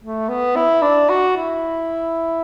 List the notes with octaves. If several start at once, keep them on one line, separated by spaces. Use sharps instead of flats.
A3
B3
E4
D4
F#4
E4